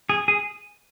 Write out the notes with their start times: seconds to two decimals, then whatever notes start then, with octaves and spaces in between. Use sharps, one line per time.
0.09 G#4
0.28 G#4